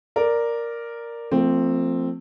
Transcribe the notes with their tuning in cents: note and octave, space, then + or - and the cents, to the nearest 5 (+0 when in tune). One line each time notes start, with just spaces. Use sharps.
A#4 +0 D5 +0
F3 +0 A3 +40 C4 +0